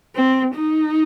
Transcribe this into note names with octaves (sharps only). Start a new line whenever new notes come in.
C4
D#4